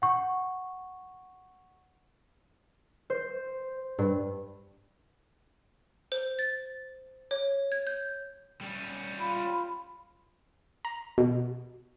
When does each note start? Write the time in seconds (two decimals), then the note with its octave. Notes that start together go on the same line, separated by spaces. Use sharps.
0.02 F#5 C#6
3.10 C5
3.98 G2
6.12 C5
6.39 A6
7.31 C#5
7.72 G#6
7.87 G6
8.61 G3 C#4
9.20 F4 B5
10.85 A#5
11.18 B2